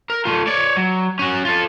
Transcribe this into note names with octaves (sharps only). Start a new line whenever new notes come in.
A#4
A3 F4
C#5 D5
F#3
C#4 F#4
F4 A4